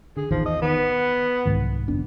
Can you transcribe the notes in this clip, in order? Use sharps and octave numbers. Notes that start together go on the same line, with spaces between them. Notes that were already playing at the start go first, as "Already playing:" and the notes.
D3 G#4
A1 E2 D#3 F3
D#5
D#3 B3
C2 G#2 D#3
F#1 B3 D4